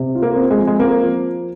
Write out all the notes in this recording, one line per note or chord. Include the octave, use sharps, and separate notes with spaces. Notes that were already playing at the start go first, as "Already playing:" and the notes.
Already playing: C3
F4
A#3
C4
G#3
F3
G#3
A#3 C4
F3